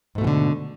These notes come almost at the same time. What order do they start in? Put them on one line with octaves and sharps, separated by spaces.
G#2 A3 B2 E3 D3